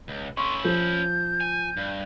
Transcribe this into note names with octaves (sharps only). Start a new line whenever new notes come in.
C#2
C#4 E4 C6 C#6
F3 G6
G#5
G2